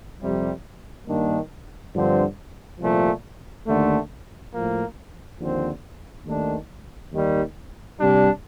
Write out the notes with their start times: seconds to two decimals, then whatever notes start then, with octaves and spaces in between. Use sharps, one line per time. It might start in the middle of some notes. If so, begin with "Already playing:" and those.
0.22 F2 C3 G3
1.08 G2 D#3 A#3 D4
1.95 G2 D3 F3 C4
2.80 C2 A#2 F3 A3
3.67 D#2 D3 A3
4.54 A2 F3 A#3
5.40 D#2 D3 F3 C4
6.26 D#2 D#3 A3 D4
7.12 D#2 D#3 G3
7.99 C3 G3 D4